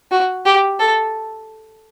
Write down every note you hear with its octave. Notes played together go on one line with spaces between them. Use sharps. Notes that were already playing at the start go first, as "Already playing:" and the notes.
F#4
G4
A4